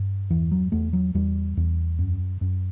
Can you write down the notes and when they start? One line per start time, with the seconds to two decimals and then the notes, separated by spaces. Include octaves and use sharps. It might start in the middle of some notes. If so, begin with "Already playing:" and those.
Already playing: G2
0.30 E2 E3
0.51 F#3
0.72 E2 A3
0.93 F#3
1.14 E2 G3
1.57 E2
1.99 F#2
2.41 F#2